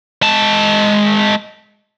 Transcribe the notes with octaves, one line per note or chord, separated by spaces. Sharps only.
G#3 A5